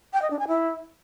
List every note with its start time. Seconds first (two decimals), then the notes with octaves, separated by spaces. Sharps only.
0.13 G5
0.22 D#5
0.31 D4
0.39 G#5
0.48 E4